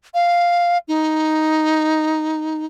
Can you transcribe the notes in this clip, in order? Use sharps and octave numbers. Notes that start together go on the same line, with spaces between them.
F5
D#4